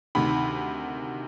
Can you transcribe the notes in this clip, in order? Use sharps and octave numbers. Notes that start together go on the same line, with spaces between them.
D2 C3 D#3 B5